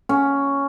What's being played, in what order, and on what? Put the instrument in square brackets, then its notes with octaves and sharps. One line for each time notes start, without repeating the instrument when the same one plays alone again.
[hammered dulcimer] C#4